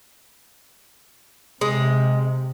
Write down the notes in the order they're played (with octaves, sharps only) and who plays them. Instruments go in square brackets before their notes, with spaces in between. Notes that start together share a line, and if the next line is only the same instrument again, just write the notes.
[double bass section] C3 [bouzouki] G#3